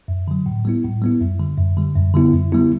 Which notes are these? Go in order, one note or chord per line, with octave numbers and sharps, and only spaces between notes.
F#2
D3 F#3
A2
G3 B3 E4
A2
G3 B3 E4
F#2
D3 G3
F#2
D3 G3
F#2
D3 G3 B3 E4
F#2
D3 G3 B3 E4